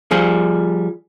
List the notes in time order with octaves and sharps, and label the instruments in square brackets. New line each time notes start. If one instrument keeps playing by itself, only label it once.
[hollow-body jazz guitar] F3 G3 G#4